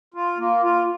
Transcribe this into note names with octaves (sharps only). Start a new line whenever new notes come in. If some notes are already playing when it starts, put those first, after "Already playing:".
F4
A#3
F4